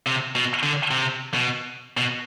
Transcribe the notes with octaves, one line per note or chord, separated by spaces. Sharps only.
C3
B2
D3
C3
B2
B2